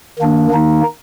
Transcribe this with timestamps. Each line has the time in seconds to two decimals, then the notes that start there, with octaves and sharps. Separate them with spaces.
0.19 D#3 A#3 D4
0.51 D#3 A#3 D#4